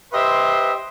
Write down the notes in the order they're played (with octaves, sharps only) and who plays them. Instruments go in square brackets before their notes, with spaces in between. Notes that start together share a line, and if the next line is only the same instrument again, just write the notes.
[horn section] G4 B4 C5 D#5 E5 C6